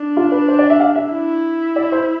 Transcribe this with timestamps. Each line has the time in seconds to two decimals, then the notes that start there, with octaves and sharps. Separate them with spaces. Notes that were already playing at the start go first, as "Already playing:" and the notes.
Already playing: D4
0.17 F4
0.32 B4
0.48 C5
0.59 D5
0.70 E5
0.80 F5
0.96 E5
1.13 E4
1.76 D5
1.92 C5